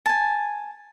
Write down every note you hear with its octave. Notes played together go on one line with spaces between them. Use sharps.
G#5 A5